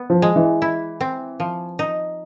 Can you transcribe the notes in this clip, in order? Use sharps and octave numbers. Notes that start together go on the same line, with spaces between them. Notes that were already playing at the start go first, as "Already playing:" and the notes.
Already playing: B3
F3
G#3
E3
E4
C4
F3
D#4